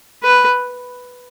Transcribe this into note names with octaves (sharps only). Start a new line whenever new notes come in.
B4